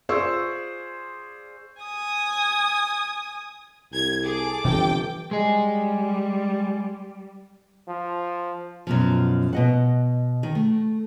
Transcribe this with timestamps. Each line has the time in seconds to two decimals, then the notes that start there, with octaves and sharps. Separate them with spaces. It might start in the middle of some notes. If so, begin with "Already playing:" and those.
0.09 F4 G#4 C5 D5 C#6 E6
1.82 G#5 D#6
3.93 C2 G#6
4.24 G#4 A4 D6
4.65 G1 C3 E3 F3 G5
5.31 G3 G#3 G#4
7.88 F3
8.87 F#2 B2 F3
9.53 B2 D#5 F#5
10.43 D#3
10.55 A3